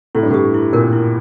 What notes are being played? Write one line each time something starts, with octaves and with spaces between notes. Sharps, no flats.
A2 E4
G2
A2 G4
E4
A#2 A#4
E4